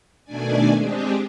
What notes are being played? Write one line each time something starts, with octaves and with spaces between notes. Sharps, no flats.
B2 D#3 A3 D4 D5 G#5
G#3 C4 D4 G4 G#4